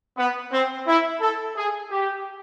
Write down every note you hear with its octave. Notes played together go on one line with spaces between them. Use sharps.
B3
C4
E4
A4
G#4
G4